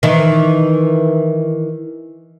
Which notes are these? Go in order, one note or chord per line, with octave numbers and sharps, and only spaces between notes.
D#3 E3